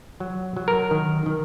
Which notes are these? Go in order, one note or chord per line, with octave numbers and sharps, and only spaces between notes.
F#3
F#3
A#4
D#3
D#3